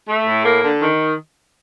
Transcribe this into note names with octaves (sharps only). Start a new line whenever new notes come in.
A3
A2
A#3
D3
D#3